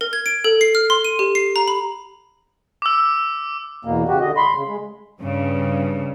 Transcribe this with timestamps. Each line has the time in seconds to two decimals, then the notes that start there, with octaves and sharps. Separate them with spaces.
0.01 A#4
0.13 G#6
0.26 D7
0.44 A4
0.61 C7
0.75 F6
0.90 C6
1.05 D#7
1.19 G4
1.35 C7
1.56 A#5
1.68 B5
2.82 D6 E6
3.85 E2 B2 A#3
4.08 C#3 F#4 G4
4.21 D3 D#5
4.37 B5 C6
4.54 C#3
4.67 G#3
5.19 G2 C#3